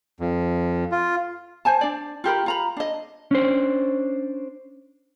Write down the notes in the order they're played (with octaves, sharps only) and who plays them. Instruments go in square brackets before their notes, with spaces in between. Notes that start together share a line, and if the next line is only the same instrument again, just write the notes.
[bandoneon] F2
F4
[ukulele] C5 G#5 A5
D4 D5
F4 G4 A#4 B5
F4 A#5 B5
D4 D#5
[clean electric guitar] C#4 D4 C5